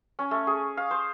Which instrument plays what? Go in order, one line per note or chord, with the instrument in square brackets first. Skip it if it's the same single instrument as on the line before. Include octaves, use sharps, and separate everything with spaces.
[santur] C#4
A3
G#4
F5
C5